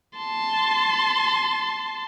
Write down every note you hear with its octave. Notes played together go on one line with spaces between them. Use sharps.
A5 C6